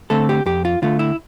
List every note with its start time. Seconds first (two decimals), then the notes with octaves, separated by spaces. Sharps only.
0.10 D3 A3 C4 A4
0.29 G4
0.46 F2 G4
0.65 F4
0.82 D3 A3 F4
0.99 E4